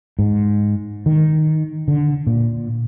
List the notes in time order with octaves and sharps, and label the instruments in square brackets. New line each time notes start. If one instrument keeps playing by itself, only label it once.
[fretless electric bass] G#2
D#3
D3
A#2